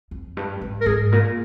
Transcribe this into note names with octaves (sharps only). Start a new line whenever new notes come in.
F2
G2
G#2
A#4
G#2 G#4
A#2 A#4